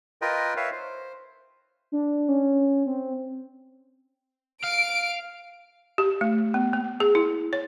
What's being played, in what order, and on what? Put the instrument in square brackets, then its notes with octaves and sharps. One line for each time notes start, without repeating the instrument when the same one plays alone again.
[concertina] F4 A#4 B4 D#5 G5
B4 C#5 E5 F5
C5
[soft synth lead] D4
C#4
C4
[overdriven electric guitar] F5 [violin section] D7
[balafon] G4
A3
B3
A#3
G#4
E4
C#5